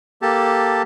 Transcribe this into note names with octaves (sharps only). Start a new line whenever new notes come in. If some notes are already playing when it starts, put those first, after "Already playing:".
A#3 G4 A4 A5